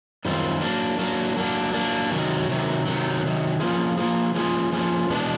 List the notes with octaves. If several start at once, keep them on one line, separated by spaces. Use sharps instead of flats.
F#2 D#3 G3 C4 F4
F#3 A#3 D4
F#3 A#3 D4
F#3 A#3 D4
F#3 A#3 D4
C3 D#3 F#3
C3 D#3 F#3
C3 D#3 F#3
C3 D#3 F#3
F3 A#3 C#4 F4 G#4
F3 A#3 C#4 F4 G#4
F3 A#3 C#4 F4 G#4
F3 A#3 C#4 F4 G#4
E2 B2 G#3 B3 D4